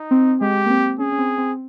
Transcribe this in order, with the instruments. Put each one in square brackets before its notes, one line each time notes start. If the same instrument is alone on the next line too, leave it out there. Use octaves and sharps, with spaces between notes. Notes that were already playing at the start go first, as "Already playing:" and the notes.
Already playing: [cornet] D#4
[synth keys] C4
[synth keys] G#3 [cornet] G4
[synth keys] A#3
C4
[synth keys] C#4 [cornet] G#4
[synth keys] C#4
C4
C4